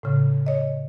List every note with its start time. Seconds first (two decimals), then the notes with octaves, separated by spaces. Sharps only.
0.03 A2 C#3
0.46 C#5 D#5